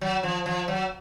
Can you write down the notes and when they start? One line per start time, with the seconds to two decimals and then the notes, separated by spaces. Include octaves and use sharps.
0.01 F#3
0.23 F3
0.46 F3
0.68 F#3